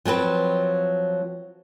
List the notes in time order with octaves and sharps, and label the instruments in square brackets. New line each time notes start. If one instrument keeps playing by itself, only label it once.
[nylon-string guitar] F3 F#3 C4 B4